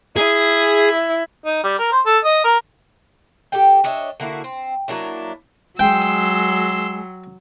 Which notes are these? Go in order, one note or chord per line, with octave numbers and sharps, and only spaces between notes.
E4 G#4
D#4
G3
A#4
C5
A4
D#5
A#4
G4 A4 G5
D4 C#5 D#5 E5
D3 A#3 E4 F#4
C4
F#3 A#3 D4 E4
F#3 G#3 G5 C6 E6